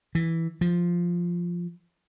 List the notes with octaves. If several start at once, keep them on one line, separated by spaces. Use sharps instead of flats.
E3
F3